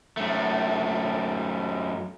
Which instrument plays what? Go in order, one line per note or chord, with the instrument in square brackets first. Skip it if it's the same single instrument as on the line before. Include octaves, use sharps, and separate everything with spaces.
[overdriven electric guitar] F#2 A3